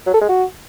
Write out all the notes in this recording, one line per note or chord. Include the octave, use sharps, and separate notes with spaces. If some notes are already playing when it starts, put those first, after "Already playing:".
F#3
A4
G#3
F#4